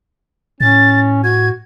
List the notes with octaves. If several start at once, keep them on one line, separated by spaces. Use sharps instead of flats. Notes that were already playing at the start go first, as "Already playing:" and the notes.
A2 C#4 A6
F#4 G#6